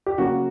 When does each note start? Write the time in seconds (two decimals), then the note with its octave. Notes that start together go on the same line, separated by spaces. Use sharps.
0.06 G4
0.18 C#3 F#3 A#3 F#4